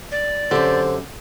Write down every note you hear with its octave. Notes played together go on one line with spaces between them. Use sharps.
D5
F#2 D3 C4 G4 C5